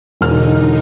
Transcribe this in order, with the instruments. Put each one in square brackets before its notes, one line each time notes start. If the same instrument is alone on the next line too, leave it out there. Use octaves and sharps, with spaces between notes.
[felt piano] E1 F6 [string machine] D3 D#4